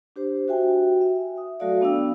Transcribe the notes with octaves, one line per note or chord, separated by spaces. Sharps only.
D4 G4 C5
F#4 E5 G5 G#5
E5
D#6
F#3 A3 F#4 A4 D5 F5
B3 D4 G5 E6